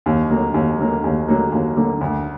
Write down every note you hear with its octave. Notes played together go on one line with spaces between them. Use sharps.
D#2
D3 F#3 A#3
D#2
D3 F#3 A#3
D#2
D3 F#3 A#3
D#2
D3 F#3 A#3
D2